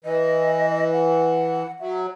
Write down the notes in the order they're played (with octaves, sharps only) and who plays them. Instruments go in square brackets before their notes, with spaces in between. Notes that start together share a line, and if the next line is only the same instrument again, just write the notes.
[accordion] E3 [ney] D#5
[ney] F#5
[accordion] F#3 [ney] E5